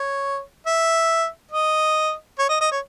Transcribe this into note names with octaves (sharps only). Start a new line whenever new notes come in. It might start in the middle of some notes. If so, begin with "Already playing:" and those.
Already playing: C#5
E5
D#5
C#5
D#5
D#5
C#5